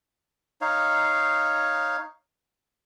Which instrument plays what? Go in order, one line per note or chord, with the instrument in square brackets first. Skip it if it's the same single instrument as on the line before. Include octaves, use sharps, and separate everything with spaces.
[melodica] D#4 C#5 F5